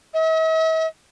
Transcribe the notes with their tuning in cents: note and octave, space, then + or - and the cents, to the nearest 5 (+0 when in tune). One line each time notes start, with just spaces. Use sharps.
E5 -45